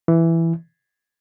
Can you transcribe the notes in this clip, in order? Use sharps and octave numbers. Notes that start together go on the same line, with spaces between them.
E3